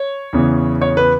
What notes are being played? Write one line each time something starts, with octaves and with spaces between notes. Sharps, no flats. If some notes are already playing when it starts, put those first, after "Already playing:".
Already playing: C#5
E2 C#3 E3
C#5
B4